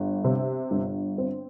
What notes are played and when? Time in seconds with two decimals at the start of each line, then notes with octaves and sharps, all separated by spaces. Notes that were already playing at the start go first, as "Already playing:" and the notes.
Already playing: G1
0.24 C3
0.71 G1
1.18 C4